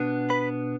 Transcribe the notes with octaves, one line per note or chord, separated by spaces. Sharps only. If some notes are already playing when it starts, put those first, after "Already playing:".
Already playing: B2 B3 D4
B4 B5